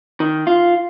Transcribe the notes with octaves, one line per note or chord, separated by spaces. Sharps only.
D#3
F4